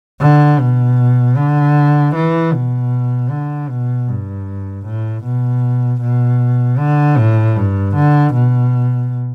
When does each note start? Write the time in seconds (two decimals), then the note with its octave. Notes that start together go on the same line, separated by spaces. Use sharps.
0.21 D3
0.60 B2
1.37 D3
2.15 E3
2.53 B2
3.30 D3
3.69 B2
4.08 G2
4.85 A2
5.24 B2
6.01 B2
6.79 D3
7.18 A2
7.56 G2
7.95 D3
8.34 B2